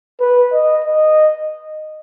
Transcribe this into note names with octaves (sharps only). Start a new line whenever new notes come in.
B4
D#5
D#5